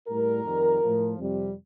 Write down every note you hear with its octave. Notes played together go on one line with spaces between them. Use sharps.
A2 G3 A#4
F2 D#3 G3
A2 F3
F2 C3 G3